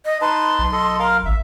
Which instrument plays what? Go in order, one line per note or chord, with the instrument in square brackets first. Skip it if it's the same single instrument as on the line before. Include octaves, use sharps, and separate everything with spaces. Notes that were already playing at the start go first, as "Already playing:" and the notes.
[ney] D#5
[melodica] D#4 B4 A5 [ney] C6
[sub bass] B1
[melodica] A4 D#5
A#4 F5
[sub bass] G#1 [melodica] E5